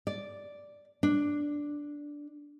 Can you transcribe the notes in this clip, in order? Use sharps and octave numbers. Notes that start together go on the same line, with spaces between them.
D5
D4